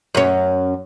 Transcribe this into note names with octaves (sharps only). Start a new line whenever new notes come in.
F#2 C#4